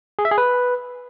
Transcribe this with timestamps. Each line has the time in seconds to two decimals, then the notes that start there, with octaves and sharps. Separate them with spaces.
0.19 G#4
0.25 E5
0.31 G#4
0.38 B4